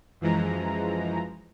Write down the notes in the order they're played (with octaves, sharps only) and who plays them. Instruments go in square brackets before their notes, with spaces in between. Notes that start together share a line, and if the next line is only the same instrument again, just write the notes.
[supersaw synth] F#2 E3 F3 G#3 A#5